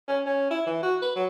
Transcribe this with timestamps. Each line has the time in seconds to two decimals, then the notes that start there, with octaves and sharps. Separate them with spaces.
0.08 C#4
0.26 C#4
0.51 E4
0.66 E3
0.83 F#4
1.02 B4
1.16 F#3